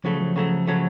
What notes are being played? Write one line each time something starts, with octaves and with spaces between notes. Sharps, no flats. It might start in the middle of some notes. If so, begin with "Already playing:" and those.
C#3 F3 F#3 A3
F3
C#3 F#3 A3
C#3 F#3 A3